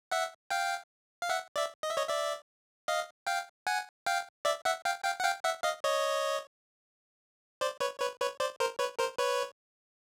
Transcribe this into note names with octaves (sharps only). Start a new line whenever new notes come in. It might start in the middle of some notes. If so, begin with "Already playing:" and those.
E5 F#5
F5 G5
F5
E5 F#5
D5 E5
D#5
E5
C#5 D#5
D5 E5
D#5 F5
F5 G5
F#5 G#5
F5 G5
D5 E5
E5 F#5
F5 G5
F5 G5
F#5
F5 G5
E5 F#5
D#5 F5
C#5 D#5
C5 D5
B4 C#5
B4 C#5
B4 C#5
C5 D5
A#4 C5
B4 C#5
A#4 C5
B4 C#5